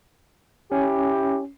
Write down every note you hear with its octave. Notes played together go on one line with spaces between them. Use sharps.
C#4 E4 G4